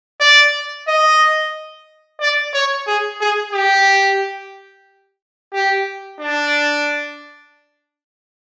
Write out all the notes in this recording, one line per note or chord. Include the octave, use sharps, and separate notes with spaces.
D5
D#5
D5
C#5
G#4
G#4
G4
G4
D4